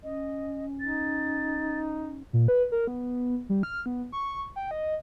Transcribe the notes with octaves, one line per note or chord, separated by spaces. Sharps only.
C#4 D#5
D#4 A6
A#2
B4
A#4
B3
G3
F6
B3
C#6
G5
D#5